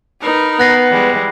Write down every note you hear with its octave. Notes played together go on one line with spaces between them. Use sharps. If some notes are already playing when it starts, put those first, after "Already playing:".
D#4 A#4 B4
B3 F#6 A#6 C7
E3 G3 G#3